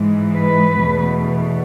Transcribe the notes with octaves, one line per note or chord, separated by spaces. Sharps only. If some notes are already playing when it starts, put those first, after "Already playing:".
Already playing: G#2 E3 G#3
B4
E2 B2 A3